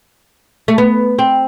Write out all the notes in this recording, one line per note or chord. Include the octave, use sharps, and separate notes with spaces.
A3
B3
C4